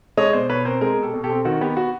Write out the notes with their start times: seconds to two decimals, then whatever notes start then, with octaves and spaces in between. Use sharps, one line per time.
0.17 G#3 C#5 D#5
0.33 B2 C5 D5
0.49 B2 B4 C#5
0.65 C4 A#4 C5
0.81 G#3 G#4 A#4
0.97 B2
1.02 G4 A4
1.13 B2
1.24 G4 A4
1.30 C4
1.45 D#3 F#4
1.61 B3 G4
1.77 F#4